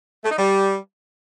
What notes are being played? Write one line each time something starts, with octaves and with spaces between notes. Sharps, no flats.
A3
D#4
G3